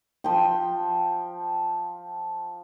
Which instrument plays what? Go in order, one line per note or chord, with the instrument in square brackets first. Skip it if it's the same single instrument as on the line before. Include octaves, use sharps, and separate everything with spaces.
[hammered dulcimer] F3 G5